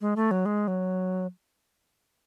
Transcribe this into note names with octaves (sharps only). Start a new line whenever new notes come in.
G#3
A3
F#3
G#3
F#3